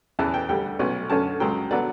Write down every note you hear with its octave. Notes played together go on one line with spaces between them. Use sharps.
E2 C#3 E3 A5
G5
D2 D3 G3 G5
B1 B2 A3 C#4
F#2 D3 A3 C#4 A5
C#2 C#3 F#3 G5
D3 F#3 B3 D5